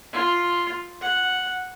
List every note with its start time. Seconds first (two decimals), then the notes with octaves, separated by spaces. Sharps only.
0.13 F4
1.01 F#5